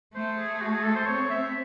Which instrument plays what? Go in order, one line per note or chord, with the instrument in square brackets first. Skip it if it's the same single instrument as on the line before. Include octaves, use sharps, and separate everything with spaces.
[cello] A3 [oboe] C5
[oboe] G#4
G#4
F#4
G#4
A4
C5
[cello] C4 [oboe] C#5
[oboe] E5